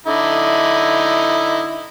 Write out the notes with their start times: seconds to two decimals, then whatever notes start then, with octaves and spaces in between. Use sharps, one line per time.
0.06 D3 D#4 E4